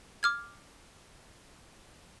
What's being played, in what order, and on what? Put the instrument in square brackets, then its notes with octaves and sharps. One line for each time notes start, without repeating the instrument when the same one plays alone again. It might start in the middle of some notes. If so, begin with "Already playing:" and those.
[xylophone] D6 F6 G#6